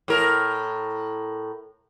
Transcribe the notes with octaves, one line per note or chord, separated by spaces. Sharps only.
A2 A#4